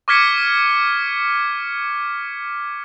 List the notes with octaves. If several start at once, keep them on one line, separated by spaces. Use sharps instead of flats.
C#6 D6 F6 G#6 B6 C#7